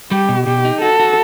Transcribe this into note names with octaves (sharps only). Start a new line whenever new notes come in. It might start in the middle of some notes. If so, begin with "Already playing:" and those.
G3 G4
B2
B2 G4
D#4
F#4 A4
F#4